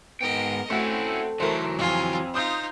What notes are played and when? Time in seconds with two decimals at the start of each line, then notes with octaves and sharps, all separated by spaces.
0.21 G#2 B3 A#4 D#5 G5
0.70 A3 C4 C#4 E4 F#4 A4
1.40 E3 F#3 A3 A#4 C5
1.79 F2 C4 F4 G#5
2.34 D#4 F4 C5 D#6 G6